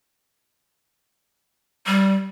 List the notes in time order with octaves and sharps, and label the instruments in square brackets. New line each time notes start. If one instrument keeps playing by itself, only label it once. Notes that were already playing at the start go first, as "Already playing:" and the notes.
[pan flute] G3